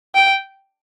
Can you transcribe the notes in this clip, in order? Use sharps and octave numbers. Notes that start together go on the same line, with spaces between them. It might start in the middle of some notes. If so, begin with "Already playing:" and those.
G5